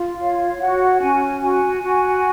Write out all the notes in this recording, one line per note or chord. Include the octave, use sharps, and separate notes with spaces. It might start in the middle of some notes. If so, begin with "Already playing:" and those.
Already playing: F4
C#5 F5
F#4 F#5
C#4 G#5
F#4 G#5
F#4